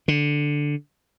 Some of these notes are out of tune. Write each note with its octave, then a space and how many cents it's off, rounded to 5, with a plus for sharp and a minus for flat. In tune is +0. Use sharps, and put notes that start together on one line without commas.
D3 +0